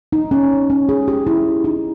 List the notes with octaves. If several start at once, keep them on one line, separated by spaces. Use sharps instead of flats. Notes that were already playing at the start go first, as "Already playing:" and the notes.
D#4
C#4
C#4
G#4
G4
E4
D#4